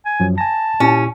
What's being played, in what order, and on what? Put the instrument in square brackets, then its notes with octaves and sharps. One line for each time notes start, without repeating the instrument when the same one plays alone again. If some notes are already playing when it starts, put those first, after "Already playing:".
[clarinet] G#5
[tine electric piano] F#2 F3 F#3
[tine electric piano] G#5 A#6 [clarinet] A5
[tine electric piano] A#2 E4 G4 [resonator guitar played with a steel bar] C#4